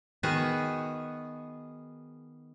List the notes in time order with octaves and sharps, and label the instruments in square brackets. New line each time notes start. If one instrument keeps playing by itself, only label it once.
[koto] D#3 B3 F#4 G#4